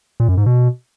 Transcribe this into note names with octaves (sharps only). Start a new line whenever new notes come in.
A#2
F#2
G#2
B2